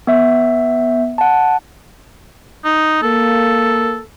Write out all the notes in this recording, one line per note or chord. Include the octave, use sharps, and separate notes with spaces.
B3 E5
F#5 A5
D#4
A#3 A4